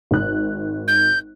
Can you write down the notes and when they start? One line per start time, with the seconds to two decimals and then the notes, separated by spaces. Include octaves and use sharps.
0.11 G#1 F#6
0.88 G6